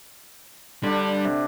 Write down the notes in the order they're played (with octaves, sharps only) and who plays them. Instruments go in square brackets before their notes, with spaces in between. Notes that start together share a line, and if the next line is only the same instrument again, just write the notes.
[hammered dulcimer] D3 D4 [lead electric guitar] G3
[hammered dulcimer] C3